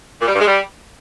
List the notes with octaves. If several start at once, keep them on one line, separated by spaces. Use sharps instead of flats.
A#2
G3
G2
G#3
G3